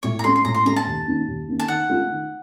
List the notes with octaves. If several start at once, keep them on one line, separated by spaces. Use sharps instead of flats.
A2 C#5
A#5
A3 C#4 C6
C6
A2 A#5
C6
A3 C#4 A#5
A5
D#2
D#3 A#3 C#4
D#2
D#3 A#3 C#4
A5
D#3 F#5
A3 C#4 F4
D#3